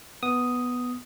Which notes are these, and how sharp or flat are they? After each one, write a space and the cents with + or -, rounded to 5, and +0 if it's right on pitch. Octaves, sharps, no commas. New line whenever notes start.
B3 +0 D#6 +0